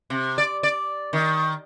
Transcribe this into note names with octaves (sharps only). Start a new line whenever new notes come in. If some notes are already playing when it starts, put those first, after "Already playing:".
C3
D5
D5
D#3